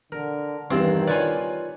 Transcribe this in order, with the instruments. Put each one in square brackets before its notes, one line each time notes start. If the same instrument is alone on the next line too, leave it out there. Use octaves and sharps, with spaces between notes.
[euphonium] D3 [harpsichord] A#4
[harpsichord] E2 G2 C6 [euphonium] D#3 [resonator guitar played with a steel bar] C4
[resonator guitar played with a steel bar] F4 C#5 D5 [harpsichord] B4 G#5